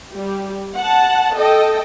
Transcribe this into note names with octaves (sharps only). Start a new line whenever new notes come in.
G3 G4
F#5 A5
A4 D#5 G5